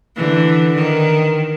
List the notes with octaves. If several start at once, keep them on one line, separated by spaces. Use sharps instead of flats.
D3 E3
D#3